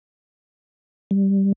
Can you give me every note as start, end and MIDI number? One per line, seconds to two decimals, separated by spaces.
1.11 1.52 55